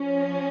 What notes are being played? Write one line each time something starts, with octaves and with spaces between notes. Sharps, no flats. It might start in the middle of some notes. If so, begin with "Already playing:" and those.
Already playing: F3 C#4